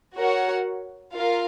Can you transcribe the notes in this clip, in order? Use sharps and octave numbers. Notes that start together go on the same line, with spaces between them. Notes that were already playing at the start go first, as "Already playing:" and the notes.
F#4 A#4 C#5 F#5
F4 A#4 F5